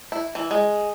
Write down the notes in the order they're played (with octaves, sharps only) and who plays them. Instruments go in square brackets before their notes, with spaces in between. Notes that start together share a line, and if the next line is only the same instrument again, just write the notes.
[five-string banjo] E4
E3
G#3